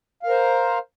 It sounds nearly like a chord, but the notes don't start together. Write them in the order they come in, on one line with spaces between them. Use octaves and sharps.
F5 A#4 C5